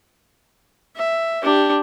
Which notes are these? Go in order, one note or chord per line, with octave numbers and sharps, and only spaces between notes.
E5
D4 G4